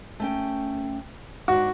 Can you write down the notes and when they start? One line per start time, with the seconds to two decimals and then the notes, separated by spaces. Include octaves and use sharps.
0.20 A3 C#4 G5
1.48 G#2 D4 F#4